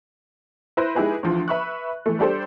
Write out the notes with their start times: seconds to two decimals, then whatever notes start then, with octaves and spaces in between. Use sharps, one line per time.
0.77 E4 B4 C5 A#6
0.95 G#3 D#4 E4 G4 G#4 B4
1.23 D2 E3 F3
1.48 B4 E5 B5 C#6 F#6
2.06 E3 A3
2.19 G3 D4 G4 A4 C5